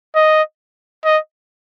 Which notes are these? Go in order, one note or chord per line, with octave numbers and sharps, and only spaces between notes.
D#5
D#5